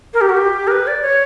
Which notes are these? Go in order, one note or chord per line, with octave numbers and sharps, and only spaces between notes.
A#4
G4
F#4
G4
A#4
B4
D5
C#5